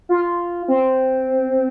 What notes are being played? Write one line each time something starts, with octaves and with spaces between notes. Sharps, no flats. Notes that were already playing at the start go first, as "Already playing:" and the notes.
F4
C4